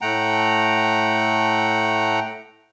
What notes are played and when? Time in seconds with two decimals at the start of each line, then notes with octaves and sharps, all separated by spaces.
0.01 A2 A3 F#5 G5 A#5